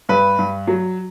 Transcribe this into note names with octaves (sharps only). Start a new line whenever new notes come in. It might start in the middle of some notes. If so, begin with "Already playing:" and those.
G2 B4
G2
F#3